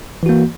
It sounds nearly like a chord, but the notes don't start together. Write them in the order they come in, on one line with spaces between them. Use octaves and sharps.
E3 F#4 A#3